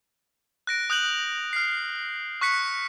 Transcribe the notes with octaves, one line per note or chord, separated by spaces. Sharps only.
F#6 A#6 D7
D#6 F#6 G6 F#7
F6 C7
C#6 F#6 B6 C#7